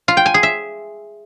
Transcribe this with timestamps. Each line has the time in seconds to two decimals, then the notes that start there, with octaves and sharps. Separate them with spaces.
0.08 F4
0.17 G5
0.26 G#5
0.34 G#4
0.43 E5